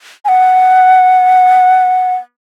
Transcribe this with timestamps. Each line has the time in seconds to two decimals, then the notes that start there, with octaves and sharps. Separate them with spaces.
0.25 G#5
0.28 F#5